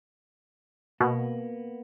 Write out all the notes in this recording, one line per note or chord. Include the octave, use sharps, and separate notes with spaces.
B2 A#3 B3